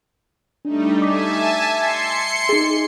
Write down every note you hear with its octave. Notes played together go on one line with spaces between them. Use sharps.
G3 A3 D4 D#4
E5 G#5 A5 D6 B6
C6 C7 C#7
D#4 G#4